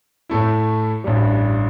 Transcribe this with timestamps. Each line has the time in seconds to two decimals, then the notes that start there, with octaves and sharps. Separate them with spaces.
0.29 A2 A3 E4
1.04 A1 G2 G3